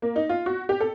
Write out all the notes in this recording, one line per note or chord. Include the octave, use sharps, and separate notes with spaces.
A#3
D#4
F4
F#4
G4
A4